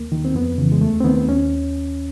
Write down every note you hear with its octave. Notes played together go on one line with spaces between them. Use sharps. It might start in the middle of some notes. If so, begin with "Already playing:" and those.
Already playing: D#2 A#3
D#3
C4
F2 B3
C#3 E3
G#3
D#2 A3
C4
D#3 B3
D#2 C#4